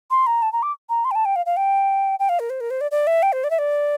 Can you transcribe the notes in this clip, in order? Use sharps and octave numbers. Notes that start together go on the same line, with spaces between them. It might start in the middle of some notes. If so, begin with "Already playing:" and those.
C6
A#5
A5
A#5
D6
A#5
C6
G5
A5
G5
F5
F5
G5
G5
F5
A#4
C5
A#4
C5
D5
D5
E5
G5
C5
D5
E5
D5